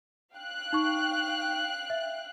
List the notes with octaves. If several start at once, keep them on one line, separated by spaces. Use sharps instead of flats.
F5 G5 F#6
D#4 C#6
E5